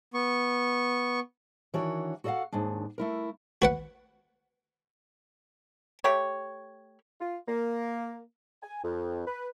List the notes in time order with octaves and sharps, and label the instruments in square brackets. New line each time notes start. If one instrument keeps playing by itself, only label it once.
[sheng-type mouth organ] B3 C#6
[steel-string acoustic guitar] D#3 E3 D4 F#4 A#4 C#5
F#4 A4 D5 D#5 F5 F#5
D#2 G#2 D#3 D4
A3 E4 A#4
[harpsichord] F#4 B4 F#5
[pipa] A3 G4 C#5
[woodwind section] F4
A#3
G#5
F2
B4